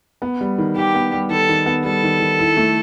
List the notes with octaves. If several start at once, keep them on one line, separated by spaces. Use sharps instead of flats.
B3
G3
D#3
D#3 G4
B3
G3
D#3 A4
D#3
B3
G3 A4
D#3
D#3
E4
A3